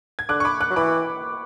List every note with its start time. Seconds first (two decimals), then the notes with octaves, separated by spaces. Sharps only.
0.19 G#6
0.29 D3 D6 F#6
0.40 C#6
0.45 B5 D6
0.61 D6 F#6
0.70 F#3
0.76 E3 B5 D6